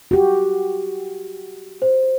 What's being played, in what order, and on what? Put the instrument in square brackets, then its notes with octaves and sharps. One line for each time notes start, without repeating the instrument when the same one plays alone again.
[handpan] F#4 G4
[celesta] C5